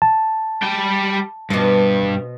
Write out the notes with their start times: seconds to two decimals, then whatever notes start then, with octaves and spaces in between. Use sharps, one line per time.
0.02 A5
0.63 G3 G5
1.50 G2 B2 C5